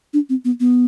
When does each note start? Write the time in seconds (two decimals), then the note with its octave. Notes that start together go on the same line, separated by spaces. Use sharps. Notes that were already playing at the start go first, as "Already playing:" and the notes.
0.13 D4
0.29 C4
0.45 B3
0.60 B3